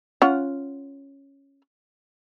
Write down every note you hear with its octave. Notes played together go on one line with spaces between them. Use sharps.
C#4 F4 F#5